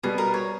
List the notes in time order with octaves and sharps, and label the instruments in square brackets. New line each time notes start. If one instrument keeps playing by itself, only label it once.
[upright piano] B2 G3 B3 [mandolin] G#4
[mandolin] A#4
C#5